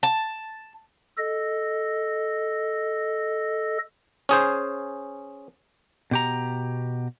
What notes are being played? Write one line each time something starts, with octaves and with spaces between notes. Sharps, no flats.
A5
A4 D#5
C#4 G#4 C5
B2 G4 A#5